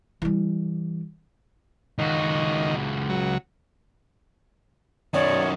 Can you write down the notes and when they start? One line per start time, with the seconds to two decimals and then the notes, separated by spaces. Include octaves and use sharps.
0.22 E3 G3
1.99 C#2 D#3 F#4
3.09 F#3
5.14 F#2 D#3 C#5 D5